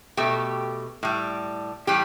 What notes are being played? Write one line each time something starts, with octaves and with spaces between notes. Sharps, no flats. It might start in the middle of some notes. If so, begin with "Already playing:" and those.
B2 A3 G4
A2 G3
A2 E3 G3 G4